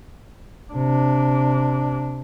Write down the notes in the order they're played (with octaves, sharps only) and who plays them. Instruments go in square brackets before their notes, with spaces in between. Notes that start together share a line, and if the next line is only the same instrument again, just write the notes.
[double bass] C3 D4